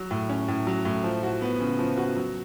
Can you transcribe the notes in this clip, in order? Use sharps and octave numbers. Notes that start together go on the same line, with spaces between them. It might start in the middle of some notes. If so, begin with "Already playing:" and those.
Already playing: F#3
A2
C#4
A2
F#3
A2
F3
F#4
B3
C#3
F3
F#4
F#3